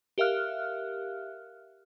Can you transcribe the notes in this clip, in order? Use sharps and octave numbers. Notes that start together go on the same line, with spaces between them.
G4 A#4 E5 F5 F6 F#6